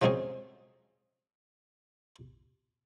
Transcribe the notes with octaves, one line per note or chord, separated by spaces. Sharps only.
F3 F#3 G#3 C4 C#4 G#4